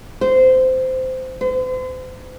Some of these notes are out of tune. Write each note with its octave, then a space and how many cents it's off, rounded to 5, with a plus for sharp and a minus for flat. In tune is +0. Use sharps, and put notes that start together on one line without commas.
C5 -15
C5 -40